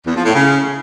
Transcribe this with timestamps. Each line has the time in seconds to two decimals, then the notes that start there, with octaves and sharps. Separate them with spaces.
0.05 E2
0.15 F3
0.25 A2
0.34 C#3